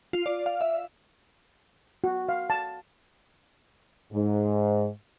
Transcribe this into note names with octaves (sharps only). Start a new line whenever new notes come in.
F4
D5
F5
E5
F#4
F5
A5
G#2